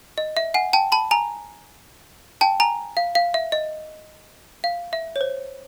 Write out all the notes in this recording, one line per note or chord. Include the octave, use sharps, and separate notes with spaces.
D#5
E5
F#5 G#5
G5 A5
A5 B5
G#5 A#5
G5 A5
G#5 A#5
F5
F5
E5
D#5
F5
E5
C#5
C5